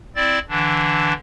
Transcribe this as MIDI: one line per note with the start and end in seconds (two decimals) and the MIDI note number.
0.16 0.39 60
0.16 0.39 64
0.16 0.39 74
0.16 0.39 93
0.49 1.13 50
0.49 1.13 52
0.49 1.13 62